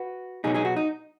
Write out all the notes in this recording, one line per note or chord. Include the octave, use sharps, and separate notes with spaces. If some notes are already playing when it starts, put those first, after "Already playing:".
Already playing: F#4 B4
B2 F#3 B3 D#4 G#4
D#4 G#4
F#4
D#4